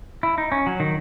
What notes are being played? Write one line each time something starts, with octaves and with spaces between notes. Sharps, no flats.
E4
D#4
C#4
F#3
D#3